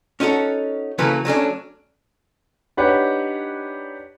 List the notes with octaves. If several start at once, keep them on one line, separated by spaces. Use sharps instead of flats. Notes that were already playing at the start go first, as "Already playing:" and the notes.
C#4 D#4 F#4 A4 F#5
C#3 E3 F#3 A#3 A4 B4
F#3 A3 C#4 D4
D4 D#4 G4 B4 C#5 F#5